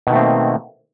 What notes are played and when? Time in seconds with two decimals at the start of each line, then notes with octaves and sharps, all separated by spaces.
0.07 B2
0.10 D#3
0.13 A3
0.15 C4
0.18 A#3